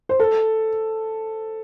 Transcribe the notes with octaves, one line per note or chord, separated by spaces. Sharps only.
C5
A4